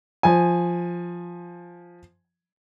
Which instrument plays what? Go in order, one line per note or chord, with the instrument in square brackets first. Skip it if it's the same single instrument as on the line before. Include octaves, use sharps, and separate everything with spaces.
[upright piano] F3 G#5